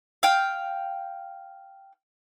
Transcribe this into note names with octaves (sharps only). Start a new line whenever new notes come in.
F5 G5